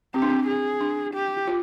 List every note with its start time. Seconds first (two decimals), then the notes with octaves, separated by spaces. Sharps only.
0.14 C4 G4
0.22 D4
0.29 C4
0.47 G#4
0.81 D4
1.14 G4
1.48 F4